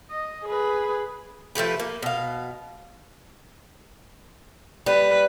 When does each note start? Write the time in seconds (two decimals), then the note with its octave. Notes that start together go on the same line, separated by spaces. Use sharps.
0.10 D#5
0.45 G#4 B4
1.55 F3 A3 G4 B4
1.80 A#3
2.02 B2 F5
4.86 G3 B4